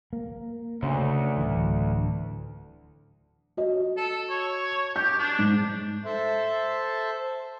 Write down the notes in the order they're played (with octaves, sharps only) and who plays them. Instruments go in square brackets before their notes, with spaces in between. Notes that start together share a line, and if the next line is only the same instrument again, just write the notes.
[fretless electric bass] A#3
[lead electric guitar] D2 [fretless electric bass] C#3 C#4
[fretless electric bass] D1 E3
[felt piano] F#4 D#5
[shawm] A4
C#5
[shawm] G4 [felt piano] G6
[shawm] D4
[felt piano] G#2
[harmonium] A4 C5 E5 A5